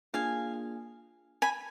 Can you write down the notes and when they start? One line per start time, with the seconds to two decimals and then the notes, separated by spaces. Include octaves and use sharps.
0.14 A#3 D4 F4 G#4 F5 G#5
1.42 G#5 B5